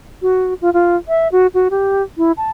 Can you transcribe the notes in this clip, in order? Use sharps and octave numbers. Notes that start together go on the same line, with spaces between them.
F#4
F4
F4
E5
F#4
F#4
G4
E4
A5